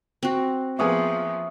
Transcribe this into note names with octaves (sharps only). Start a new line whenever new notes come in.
C4 F#4
F3 A#3 B3 G#4 E5 C#6 D#6